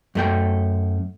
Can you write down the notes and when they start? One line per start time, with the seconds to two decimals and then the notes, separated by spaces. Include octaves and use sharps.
0.15 F#2 A3 G5